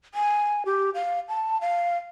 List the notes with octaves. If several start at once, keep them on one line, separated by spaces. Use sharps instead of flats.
G#5
G4
F5
A5
F5